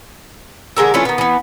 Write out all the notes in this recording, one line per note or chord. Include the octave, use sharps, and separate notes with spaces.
D3 G#3 A#4 E5
E3 A3 C#4 F4
D#3 B3
E3 B3